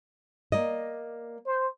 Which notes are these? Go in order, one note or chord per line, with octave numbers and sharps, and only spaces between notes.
A#3 D5 D#5
C5